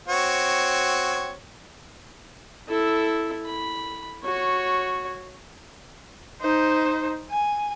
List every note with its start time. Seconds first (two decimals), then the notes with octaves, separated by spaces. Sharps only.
0.08 C4 F#4 C#5
2.69 E4 A4
3.47 B5
4.24 F#4 C#5
6.42 D#4 C5
7.31 G#5